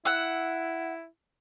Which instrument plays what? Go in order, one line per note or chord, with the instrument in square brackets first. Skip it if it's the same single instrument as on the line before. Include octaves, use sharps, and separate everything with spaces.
[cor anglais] E4 [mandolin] F#5 E6